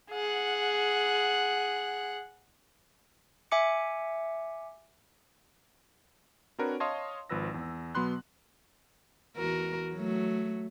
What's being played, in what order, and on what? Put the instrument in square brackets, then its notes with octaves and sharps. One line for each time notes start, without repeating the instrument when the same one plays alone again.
[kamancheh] G#4 F#5
[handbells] E5 G#5 D6 C#7
[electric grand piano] C4 D4 F#4 A#4 B4 C#5
C#5 D#5 F5 A5 C6 D#6
G#1 F3 B4 E6 A#6
E2
B2 F#3 B3 B5 C6 F#6
[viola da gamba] E2 F#4 A#4
F#3 A3